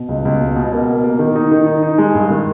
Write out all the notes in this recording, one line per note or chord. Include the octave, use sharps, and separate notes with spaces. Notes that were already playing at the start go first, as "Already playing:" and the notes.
Already playing: B2
C#2
C#2
B2
B2
A#3
B2
A#3
D#3
D#4
D#3
D#4
D#4
G#3
G2
D#3